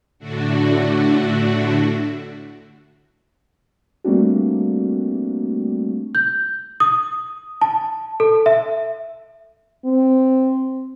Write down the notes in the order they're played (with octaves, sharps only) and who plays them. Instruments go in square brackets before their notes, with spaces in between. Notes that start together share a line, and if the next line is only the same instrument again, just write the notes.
[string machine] A2 D3 A3 D4 F#4
[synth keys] G3 A3 A#3 C4 D4 F#4
[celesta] G6
D#6
A5
A4
E5
[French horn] C4